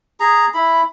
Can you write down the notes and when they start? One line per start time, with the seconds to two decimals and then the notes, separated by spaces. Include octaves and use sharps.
0.20 G#4 A#5
0.54 E4 B5